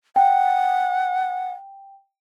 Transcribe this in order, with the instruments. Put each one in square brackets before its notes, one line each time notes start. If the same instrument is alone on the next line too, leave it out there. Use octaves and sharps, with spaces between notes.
[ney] F#5 [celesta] G5